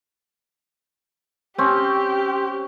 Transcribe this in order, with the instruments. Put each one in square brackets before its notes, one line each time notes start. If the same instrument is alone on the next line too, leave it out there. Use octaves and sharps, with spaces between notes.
[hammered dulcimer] C4 C#4 [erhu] G4